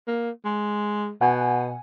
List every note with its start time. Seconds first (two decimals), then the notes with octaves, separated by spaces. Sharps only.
0.07 A#3
0.45 G#3
1.21 B2 F#5 G#5